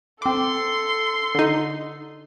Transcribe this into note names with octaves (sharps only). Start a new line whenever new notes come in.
C4 A4 C6 D6
D3 D#4